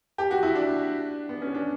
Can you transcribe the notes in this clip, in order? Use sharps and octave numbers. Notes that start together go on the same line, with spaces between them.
G4
F#4
E4
D4
B3
C#4
D4